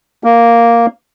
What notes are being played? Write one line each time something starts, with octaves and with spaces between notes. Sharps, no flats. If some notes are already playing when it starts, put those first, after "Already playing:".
A#3